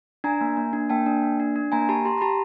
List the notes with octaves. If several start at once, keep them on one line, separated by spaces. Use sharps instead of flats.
D4 G#5 A#5
A#3
A#3
D4
A#3 G5 A5
D4
A#3
D4
D4
A#3 G#5 A#5
G4 A5 B5
G4 A#5 C6
A#5
G4 A5 B5